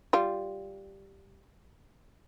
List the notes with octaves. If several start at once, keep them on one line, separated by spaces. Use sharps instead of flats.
G3 F4